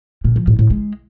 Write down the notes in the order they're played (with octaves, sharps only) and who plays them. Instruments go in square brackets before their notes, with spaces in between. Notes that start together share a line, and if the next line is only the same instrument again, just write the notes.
[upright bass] A#2
F3
A2
A2
G#3